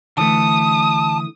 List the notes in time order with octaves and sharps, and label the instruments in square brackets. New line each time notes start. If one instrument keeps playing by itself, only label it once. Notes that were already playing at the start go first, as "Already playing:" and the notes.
[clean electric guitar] D3 E3 A3 [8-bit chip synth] A5 [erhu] D#6